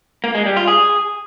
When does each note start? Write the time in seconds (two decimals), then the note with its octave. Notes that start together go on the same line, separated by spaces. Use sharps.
0.24 A#3
0.35 G#3
0.46 G3
0.57 F4
0.68 G#4